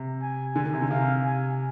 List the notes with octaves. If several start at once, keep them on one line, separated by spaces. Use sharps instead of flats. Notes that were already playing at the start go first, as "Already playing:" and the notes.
Already playing: C3
G#5
D3 G#5
D#3
C3
D3
C3 F5
G#5